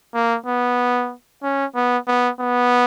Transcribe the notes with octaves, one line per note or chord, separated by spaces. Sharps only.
A#3
B3
C#4
B3
B3
B3